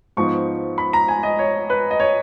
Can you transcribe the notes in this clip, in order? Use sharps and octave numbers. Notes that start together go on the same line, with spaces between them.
G#2 F3 B3 D#4 C#6
B5
A#5
G#5
D#5
C#5
B4
D#5
C#5